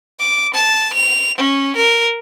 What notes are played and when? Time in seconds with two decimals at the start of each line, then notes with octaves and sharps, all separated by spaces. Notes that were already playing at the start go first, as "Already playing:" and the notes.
0.19 D6
0.54 A5
0.94 F7
1.38 C#4
1.76 A#4